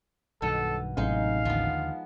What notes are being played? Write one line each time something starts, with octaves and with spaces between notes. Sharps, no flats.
B1 G2 B2 D#3 A4
A1 C3 F#3 G#3 C4 D#4 F5
D#2 D3 F3 B3